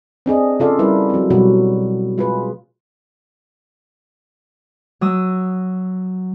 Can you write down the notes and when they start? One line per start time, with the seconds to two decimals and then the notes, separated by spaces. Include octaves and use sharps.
0.26 C4 D4 G#4 D#5
0.60 C#3 D4 F4 A4 D5 F5
0.79 G3 E4 A#4 B4
1.10 F#3 C4
1.30 B2 F#3 G3 F#4
2.18 G#3 F4 G#4 B4
5.01 F#3 D#6 E6